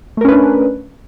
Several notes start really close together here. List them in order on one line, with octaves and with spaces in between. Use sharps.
A3 A#4 C#4 B4 D4